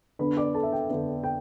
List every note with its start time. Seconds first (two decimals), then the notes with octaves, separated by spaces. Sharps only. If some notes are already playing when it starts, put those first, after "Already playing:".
0.19 D3 B3 D4 B4 B5
0.37 D5 D6
0.55 A4 A5
0.63 E5
0.72 G5
0.89 D3 B3 D4
1.24 G5